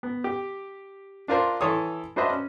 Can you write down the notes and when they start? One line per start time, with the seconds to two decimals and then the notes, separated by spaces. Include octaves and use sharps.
0.03 B3
0.24 G4
1.28 D4 F4 A#4 C5
1.61 E3 A4 C#5 C6 D#6
2.16 D4 F#4 B4 C5 D#5 E5
2.30 C#4